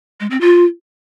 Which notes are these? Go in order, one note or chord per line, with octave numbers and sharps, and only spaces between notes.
G#3
C4
F4